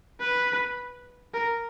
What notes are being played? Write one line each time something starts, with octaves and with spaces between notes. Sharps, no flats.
B4
A#4